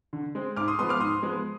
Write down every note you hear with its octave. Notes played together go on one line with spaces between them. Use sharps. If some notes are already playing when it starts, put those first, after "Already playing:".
D3
G#3 C4
G#2 D6 F6
C6 D#6
F3 G#3 B3 C6 D#6
D6 F6
G#2 C6 D#6
F3 G#3 B3